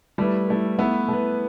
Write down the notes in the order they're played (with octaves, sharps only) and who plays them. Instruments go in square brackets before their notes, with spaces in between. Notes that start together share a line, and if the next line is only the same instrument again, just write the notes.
[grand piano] G3 [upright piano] A3 E4 B4
[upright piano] A3 E4 B4
[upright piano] A3 E4 B4 [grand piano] B3
[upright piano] A3 E4 B4